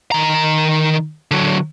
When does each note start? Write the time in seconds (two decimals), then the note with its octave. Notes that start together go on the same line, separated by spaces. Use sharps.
0.12 D#3 A#5
1.31 D3 F#3